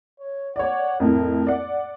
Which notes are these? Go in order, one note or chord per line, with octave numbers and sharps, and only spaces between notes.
C#5
C#5 D5 F#5
F2 A2 A#4
D5 F#5